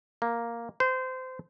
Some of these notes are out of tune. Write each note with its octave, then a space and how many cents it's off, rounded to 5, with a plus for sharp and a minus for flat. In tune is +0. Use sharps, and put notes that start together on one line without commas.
A#3 +0
C5 -25